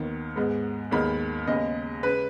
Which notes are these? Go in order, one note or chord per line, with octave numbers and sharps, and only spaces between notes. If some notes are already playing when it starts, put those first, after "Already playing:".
Already playing: D#2 D#3 B3
G#2 G#3 B3
D#2 D#3 G#3 B3 B5
D#2 C#3 G#3 B3 D#5
C#3 G#3 B4